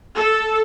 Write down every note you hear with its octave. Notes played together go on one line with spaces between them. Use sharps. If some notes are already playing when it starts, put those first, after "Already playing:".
A4